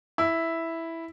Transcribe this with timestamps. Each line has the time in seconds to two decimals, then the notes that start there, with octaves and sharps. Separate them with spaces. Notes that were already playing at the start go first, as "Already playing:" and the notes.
0.18 E4